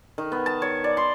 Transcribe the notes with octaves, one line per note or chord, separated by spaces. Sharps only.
D#3
B3
A5
C#5
D5
C6